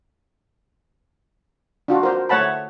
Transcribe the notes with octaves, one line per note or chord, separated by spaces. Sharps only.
D4 F4 F#4
A#4 C5
A3 C#5 F#5 A5 B5